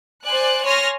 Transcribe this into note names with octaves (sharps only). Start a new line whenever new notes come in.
C5 D5 G#5 F#6
C#5 G#5 C6 F6 A#6